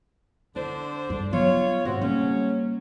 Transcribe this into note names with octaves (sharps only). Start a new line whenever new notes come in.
D3 D4 E4 C5
G2
F#3 B3 F4 C#5
G#1 C4 F#4
C#3 F#3 G3 A#3 C#4